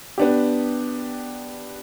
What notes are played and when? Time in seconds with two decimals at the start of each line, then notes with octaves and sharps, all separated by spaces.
0.18 B3 D4 G4